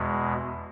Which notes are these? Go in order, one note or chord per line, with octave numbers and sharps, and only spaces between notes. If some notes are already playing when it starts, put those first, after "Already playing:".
Already playing: E2 B2 G#3